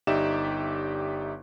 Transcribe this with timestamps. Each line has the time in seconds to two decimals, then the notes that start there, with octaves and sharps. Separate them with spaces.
0.07 G1 D#4 G4 D5 E5 E7